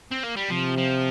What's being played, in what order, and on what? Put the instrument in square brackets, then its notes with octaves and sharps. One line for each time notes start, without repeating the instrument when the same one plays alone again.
[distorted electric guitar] C4
A#3
G3
[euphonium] C3 [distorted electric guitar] F3
[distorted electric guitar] F3